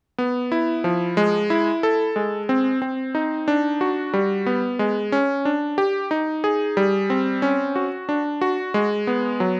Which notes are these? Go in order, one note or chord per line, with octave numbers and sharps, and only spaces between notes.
B3
E4
F3
G#3
E4
A4
G#3
C4
C4
D#4
D4
F#4
G3
B3
G#3
C#4
D4
G4
D#4
G#4
G3
C4
C#4
F#4
D4
F#4
G#3
B3
F#3